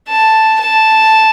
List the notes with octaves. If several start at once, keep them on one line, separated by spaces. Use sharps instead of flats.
A5
A5